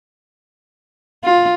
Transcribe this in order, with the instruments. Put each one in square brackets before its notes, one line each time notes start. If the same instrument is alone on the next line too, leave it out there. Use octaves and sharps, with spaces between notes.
[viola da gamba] F4